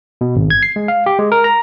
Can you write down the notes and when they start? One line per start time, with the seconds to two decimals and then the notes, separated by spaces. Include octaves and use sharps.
0.21 B2
0.36 G#1
0.50 G#6
0.63 C7
0.76 G#3
0.88 F5
1.06 G4
1.19 G#3
1.32 A#4
1.44 A#5